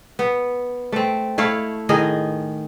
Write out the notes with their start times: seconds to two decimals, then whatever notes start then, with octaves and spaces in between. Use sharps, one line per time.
0.19 B3
0.92 A3 C4
1.38 A3 E4 C#5 F5
1.89 A2 D#3 G#4 D#5